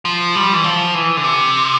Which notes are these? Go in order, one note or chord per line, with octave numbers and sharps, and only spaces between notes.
F3
G3
E3
F3
E3
D3
C3